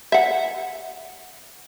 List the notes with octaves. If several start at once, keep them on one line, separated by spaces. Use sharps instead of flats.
E5 F#5